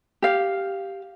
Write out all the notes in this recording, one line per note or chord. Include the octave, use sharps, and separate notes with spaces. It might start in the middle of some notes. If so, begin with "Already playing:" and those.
G4 F5